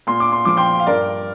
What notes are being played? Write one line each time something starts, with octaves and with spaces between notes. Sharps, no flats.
A#2 C6
D6
C6
F3 D6
G5 C6
F5
G2 A#4 D5